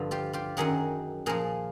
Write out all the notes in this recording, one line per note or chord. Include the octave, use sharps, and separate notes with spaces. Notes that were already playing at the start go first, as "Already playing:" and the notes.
Already playing: G2 D3 F3
F4 G4
F4 G4
F#2 D#3 F#3 F#4 G#4
A#2 F3 G#4 A#4